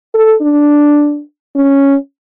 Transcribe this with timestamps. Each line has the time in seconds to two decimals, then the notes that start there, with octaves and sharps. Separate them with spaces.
0.14 A4
0.42 D4
1.56 C#4